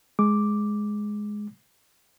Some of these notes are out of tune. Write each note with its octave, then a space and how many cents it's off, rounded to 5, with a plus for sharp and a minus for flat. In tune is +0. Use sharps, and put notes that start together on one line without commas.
G#3 +10 D6 +0